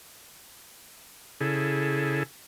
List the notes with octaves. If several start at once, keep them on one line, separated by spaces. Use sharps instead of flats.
C#3 E4 G#4 A4